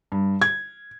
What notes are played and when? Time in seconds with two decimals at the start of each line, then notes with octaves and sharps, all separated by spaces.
0.12 G2
0.41 G#6